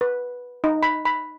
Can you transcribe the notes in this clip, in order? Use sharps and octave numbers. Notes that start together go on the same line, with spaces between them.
B4
D#4
B5
B5